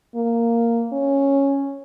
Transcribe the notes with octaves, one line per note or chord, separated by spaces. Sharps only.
A#3
C#4